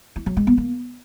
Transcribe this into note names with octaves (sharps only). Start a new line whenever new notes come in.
E4
F#3
G#3
B3
A#3